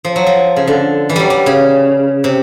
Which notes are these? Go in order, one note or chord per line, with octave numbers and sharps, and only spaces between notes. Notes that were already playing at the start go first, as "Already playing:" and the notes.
F3
F#3
F3
C#3
D3
E3
F#3 G3
G3
C#3
C3